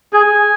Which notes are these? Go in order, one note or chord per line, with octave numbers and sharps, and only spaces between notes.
G#4 G#5